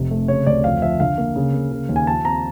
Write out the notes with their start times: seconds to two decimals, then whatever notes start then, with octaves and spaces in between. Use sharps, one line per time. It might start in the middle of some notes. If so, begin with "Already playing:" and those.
Already playing: F1 C3
0.11 A3
0.28 C#3 C#5
0.47 D2 D5
0.64 F2 F5
0.82 F3 E5
1.00 D3 F5
1.18 A#3
1.36 C#3
1.54 A#3
1.72 C#3
1.89 D#2
1.96 G#5
2.07 F3 A5
2.25 C4 A#5